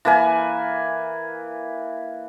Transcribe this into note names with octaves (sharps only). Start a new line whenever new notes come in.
E3 A#3 B4 G#5